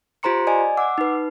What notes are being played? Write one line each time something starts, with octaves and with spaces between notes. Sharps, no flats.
F4 G4 C5 A#5 C6 C#7
D5 D#5 G#5
F#5 D6 E6
D#4 B4